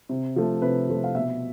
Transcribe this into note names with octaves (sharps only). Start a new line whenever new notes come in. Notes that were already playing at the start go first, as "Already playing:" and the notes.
C3
F3 A3
C3 B4
F3 A3
F5
B2 E5